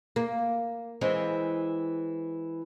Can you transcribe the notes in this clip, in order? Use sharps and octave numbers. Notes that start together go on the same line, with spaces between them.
A#3
E3 G#3 C4